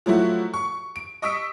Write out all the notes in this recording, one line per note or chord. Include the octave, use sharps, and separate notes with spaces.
F3 F#3 A3 E4 F#4
C#6
D7
D#5 C#6 D#6 E6 B6 D7